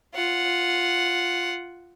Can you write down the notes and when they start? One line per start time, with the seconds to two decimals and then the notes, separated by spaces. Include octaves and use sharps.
0.15 F4 F#5